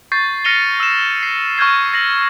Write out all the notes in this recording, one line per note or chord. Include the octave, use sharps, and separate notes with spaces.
C#6 G6 A6 C7
F6 A#6 C#7 D#7 F7 G7
E6 E7
C7
C#6 F6 G6 G#6 C7
A#6 C7 F#7